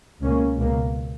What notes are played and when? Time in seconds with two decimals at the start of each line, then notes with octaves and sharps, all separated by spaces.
0.22 C#2 B2 A#3 C#4
0.57 C#2 B2 A#3